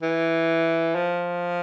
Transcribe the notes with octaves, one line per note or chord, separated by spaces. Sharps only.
E3
F3